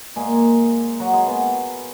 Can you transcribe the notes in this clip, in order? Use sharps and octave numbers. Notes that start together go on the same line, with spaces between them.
A#2 G#3 A#3 G#4
F#3 F#4
G#3 G#4
B3